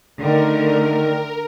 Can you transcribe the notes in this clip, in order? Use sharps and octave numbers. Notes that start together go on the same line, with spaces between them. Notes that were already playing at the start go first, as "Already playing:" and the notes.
D3 D#3 A3 A#4